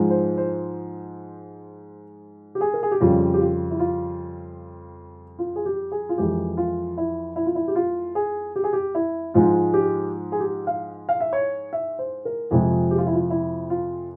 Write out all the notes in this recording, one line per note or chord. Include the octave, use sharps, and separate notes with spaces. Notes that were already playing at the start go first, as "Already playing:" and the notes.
Already playing: G#2 F3 G#3
C5
C5
G4
G#4
A#4
G#4
G4
F2 C#3 G3 F4
G4
F4
E4
F4
F4
G#4
G4
G#4
F4
F2 E3 G#3 G4
F4
E4
E4
F4
E4
G4
F4
G#4
G4
G#4
G4
E4
G#2 F3 G#3 F4
G4
G#4
G4
F5
F5
E5
C#5
E5
C5
A#4
F2 C3 F3 G#3 G#4
G4
F4
E4
F4
E4
F4